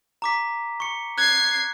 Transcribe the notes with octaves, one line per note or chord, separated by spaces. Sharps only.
A#5 D6 B6
C#6 C#7
F#6 G#6 C7